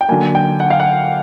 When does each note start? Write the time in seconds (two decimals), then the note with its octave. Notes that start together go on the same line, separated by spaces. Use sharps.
0.01 G5
0.09 D3 F#3 A#3 G#5
0.35 G5
0.60 F#5
0.70 F5
0.80 F#5